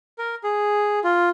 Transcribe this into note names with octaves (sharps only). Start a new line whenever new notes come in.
A#4
G#4
F4